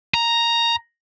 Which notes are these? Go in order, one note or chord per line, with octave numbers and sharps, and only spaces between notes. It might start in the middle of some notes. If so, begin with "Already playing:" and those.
A#5